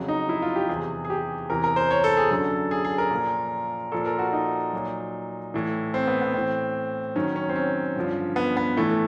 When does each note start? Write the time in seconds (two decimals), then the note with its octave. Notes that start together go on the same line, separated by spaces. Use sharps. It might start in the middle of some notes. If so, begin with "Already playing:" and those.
Already playing: F2 C#3 F#3
0.08 D#4
0.29 E4
0.42 F4
0.56 G4
0.69 E2 C3 E3 G#4
1.05 G#4
1.10 G4
1.50 E2 C3 E3 A#4
1.64 A#4
1.76 C5
1.91 C#5
2.04 A4
2.17 G#4
2.31 F#2 D3 F#3 A4
2.71 G#4
2.85 G#4
2.98 A#4
3.11 A#2 F3
3.92 A#2 F3 A4
4.06 A#4
4.19 F#4
4.33 D#4
4.73 A#2 F#3
5.54 A2 E3
5.94 C4
6.07 B3
6.21 B3
6.34 A2 E3 C4
7.15 F#2 D#3 F#3 C#4
7.36 C#4
7.49 C4
7.56 C#4
7.96 G2 D3 F3
8.36 B3
8.57 B3
8.77 A2 E3 A3